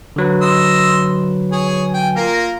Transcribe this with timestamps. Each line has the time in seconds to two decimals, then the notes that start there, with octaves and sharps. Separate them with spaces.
0.16 D3 F#3 B4
0.41 D#5 C6 E6
1.52 G#4 C#5
1.94 G5 G#5
2.16 A#3 F4 A#4